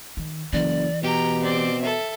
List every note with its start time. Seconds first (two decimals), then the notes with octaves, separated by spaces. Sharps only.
0.17 D#3
0.53 F#1 E3 D5
1.03 B2 G4 G5 A#5
1.43 C4 D5
1.80 A4 E5